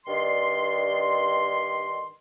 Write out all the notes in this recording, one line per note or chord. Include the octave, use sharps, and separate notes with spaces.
G2 D#3 D5 C6